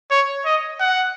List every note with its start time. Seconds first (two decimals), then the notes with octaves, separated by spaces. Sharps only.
0.11 C#5
0.45 D#5
0.80 F#5